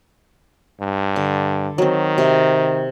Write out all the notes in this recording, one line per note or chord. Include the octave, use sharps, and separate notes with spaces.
G2
D3
D#3 F#3 C4
C3